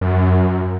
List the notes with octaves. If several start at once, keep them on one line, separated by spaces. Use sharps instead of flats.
F#2